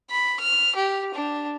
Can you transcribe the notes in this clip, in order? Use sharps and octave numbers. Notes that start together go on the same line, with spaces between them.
B5
F6
G4
D4